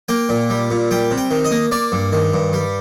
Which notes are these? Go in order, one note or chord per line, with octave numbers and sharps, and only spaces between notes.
A#3 G5
A#2
G3
A#2
G3 G5
C3
G5
D#3
D#5
A#3
A#3 D5
G2
D#3
G2
G3